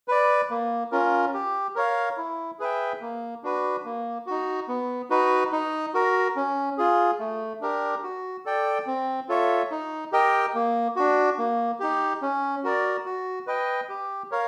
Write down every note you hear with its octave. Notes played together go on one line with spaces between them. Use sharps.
B4 D5
A#3
C#4 F4 A#4
G4
A#4 C#5 F5
E4
G#4 B4 E5 G5
A#3
D4 F#4 B4
A#3
D#4 F#4
B3
D#4 F#4 B4
D#4
F#4 A#4
C#4
F4 G#4
A3
D4 G4 A#4
F#4
A4 D5 G5
C4
F4 A4 C#5 E5
D#4
G4 A#4 D#5 G5
A#3
D4 F#4
A#3
D#4 G4
C#4
F#4 A#4 D5
F#4
B4 D#5 G5
G4
A#4 C#5 F5